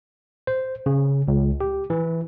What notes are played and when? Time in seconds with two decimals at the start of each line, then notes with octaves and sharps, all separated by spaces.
0.47 C5
0.86 C#3
1.28 C#2
1.61 G4
1.90 E3